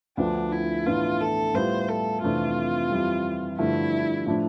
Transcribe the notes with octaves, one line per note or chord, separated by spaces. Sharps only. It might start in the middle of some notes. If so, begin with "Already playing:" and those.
D2 D3 F3 B3 D4
E4
A2 E3 B3 D4 F4
A4
A2 G3 B3 F4 C5
A4
F2 C3 E3 A3 D4 F4
F2 E3 G3
G2 D3 F3 A3 E4
A2 F3 A3 D4